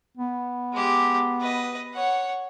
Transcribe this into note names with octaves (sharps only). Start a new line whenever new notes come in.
B3
G#3 G4
B4 D#5
C#5 F#5